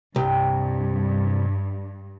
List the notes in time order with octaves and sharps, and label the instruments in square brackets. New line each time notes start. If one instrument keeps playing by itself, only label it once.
[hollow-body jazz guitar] C2 [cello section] G2 [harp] G5